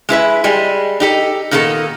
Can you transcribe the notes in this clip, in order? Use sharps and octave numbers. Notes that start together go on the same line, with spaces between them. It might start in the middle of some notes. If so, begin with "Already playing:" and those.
G#3 E4 B4 E5
G3 G#3 G#5
D#4 G4 A4
A#2 D#3 A#3 B3 F4 A4